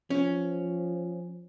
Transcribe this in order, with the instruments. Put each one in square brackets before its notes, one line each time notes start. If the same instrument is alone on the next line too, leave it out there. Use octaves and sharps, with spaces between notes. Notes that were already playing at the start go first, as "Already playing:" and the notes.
[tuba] F3 [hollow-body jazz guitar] C#4